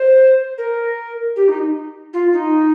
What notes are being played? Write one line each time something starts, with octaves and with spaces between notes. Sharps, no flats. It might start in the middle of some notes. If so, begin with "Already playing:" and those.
Already playing: C5
A#4
G4
D#4
F4
D#4